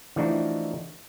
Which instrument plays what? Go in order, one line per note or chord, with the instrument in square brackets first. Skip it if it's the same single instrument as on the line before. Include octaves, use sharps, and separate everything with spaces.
[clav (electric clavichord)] E3 F3 A3 D4 D#4 F#4